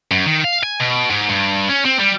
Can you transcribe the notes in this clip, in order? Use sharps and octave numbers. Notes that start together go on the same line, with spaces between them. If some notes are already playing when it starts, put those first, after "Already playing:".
F#2
D#3
F5
G#5
B2
G#2
G2
C#4
C4
G3